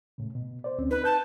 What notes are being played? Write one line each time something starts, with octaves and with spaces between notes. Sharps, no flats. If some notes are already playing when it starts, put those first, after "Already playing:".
A2 C#3
B2
C5 D5
D2 C4 C#4
D#4 B4 B5
A5 G6